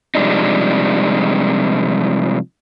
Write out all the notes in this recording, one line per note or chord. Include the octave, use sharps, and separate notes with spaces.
C3 F3 G3 G#3 D4 D#4